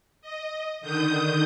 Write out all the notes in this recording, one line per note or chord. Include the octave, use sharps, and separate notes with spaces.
D#5
D3 D#3 D#6 G6